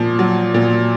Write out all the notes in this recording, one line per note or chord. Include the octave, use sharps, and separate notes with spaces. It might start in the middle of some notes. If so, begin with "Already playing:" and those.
Already playing: A#2 F3
F#3
A#2